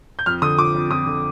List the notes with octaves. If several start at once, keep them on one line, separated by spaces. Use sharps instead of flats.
G6
F2 F6
D3 D#6
F3 D6
F2
F2 D#6
D3